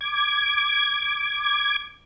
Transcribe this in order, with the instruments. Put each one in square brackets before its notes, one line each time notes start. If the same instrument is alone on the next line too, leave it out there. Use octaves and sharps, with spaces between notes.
[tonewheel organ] D6 G#6